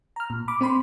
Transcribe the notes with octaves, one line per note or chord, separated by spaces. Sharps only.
A#5 F6
A#2
B5 D6
C4 C5 B5 C6